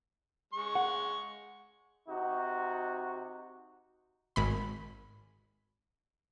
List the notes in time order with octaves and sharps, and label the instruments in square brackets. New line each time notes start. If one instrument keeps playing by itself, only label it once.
[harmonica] G#3 C#6
[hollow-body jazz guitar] F#5
[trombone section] C3 D#4 F#4
[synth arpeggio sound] G#1 B5